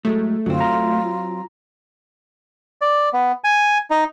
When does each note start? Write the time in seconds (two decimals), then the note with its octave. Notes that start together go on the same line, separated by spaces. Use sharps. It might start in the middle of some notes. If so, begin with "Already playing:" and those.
0.05 A2 F#3 G#3 A3
0.46 F#2 D3 F#3 C4 F4
0.60 A#5
2.81 D5
3.13 B3
3.44 G#5
3.90 D#4